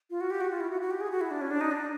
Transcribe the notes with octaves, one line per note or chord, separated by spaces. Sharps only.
F4
F#4
G4
F#4
F4
E4
F#4
F#4
G4
G#4
F#4
E4
D4
C#4
D4
D#4
D4